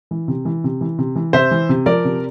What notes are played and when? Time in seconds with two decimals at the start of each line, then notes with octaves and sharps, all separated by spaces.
0.11 E3
0.28 C3
0.45 E3
0.64 C3
0.81 E3
0.99 C3
1.16 E3
1.33 C3 C5 E5
1.51 E3
1.69 C3
1.86 F3 A#4 D5
2.05 C3